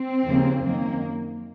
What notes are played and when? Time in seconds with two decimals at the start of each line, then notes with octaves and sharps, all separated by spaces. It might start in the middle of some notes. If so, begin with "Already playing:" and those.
Already playing: C4
0.25 D#2 C#3 F3 A#3
0.63 F#2 D#3 F#3 A#3